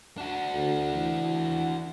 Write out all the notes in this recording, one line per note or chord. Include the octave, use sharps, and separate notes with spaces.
D4 F#4
D2
E3